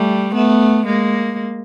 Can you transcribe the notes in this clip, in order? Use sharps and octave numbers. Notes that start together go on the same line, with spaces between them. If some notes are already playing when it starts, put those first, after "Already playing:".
Already playing: G3 A3
A3 B3
G#3 A#3